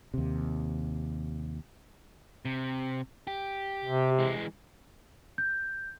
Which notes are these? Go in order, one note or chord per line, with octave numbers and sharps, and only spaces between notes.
D#2 C3
C3
G4
C3
E3 G#3
G6